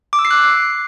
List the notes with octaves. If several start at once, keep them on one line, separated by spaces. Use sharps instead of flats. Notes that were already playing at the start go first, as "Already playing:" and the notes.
D6
E6
C7
F#6